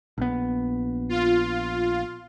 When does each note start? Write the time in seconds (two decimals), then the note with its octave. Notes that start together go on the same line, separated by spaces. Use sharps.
0.18 A#1 B3
1.09 F4